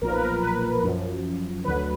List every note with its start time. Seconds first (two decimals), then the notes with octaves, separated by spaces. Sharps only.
0.02 B1 A#2 F3 A#4
0.12 B4
0.21 A#4
0.42 B4
0.83 F#2 F3
1.65 D2 D3 F#3 B4